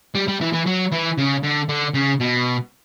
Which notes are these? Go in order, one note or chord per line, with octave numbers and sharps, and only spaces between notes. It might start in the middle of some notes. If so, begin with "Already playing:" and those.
G3
G3
E3
E3
F#3
E3
C#3
D3
D3
C#3
B2